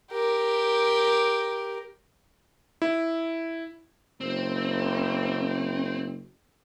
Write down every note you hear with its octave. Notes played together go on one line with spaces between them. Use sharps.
G4 A#4
E4
F#1 C4